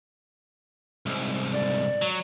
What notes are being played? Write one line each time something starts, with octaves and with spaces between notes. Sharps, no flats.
C2 G#2
D5
F#3